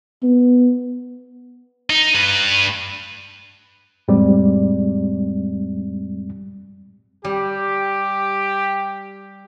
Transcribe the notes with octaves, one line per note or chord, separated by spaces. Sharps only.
B3
D#4
G2 B4
F2 A2 G3 G#3 C4 D5
G3 G4